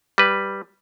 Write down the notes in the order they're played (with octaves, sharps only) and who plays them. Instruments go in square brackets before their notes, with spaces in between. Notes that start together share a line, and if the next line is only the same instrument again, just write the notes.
[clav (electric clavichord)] G3 B4